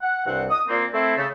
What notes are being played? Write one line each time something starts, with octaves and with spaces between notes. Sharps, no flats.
F#5
C2 G2 C4 F#5
D#6
A#2 A#3 C4
A3 C4 E4
C#3 A3